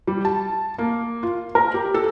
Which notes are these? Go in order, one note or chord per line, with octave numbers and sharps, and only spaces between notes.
G3
A5
A#3
F4
A#4
G4
A4